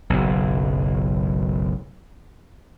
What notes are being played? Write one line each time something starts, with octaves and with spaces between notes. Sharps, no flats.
F#1 B1